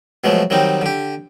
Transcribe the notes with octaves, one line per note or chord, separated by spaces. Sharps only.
B2 F3 F#3 G#3 A3
D#3 F#3 G3 C4 D#4
D3 G4